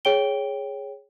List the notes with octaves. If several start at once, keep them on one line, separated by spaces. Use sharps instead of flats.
G#4 C#5 G5 D7 G7